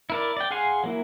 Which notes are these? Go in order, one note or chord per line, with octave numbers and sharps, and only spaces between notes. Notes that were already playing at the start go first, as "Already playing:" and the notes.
E4 A#4 D5
D5 G5
G#4 F5 F#5 G#5 C6
F#3 A#3 E4